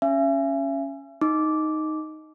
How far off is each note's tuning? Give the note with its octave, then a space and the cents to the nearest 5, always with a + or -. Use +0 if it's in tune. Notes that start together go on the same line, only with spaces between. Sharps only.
C#4 +0 E5 +40 G#5 +0
D#4 +0 D6 -10